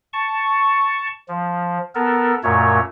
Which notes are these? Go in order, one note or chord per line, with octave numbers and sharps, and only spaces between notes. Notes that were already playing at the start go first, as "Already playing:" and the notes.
A5 C#6
F3
B3 A4 A#4
F#2 A#2 A3 C#5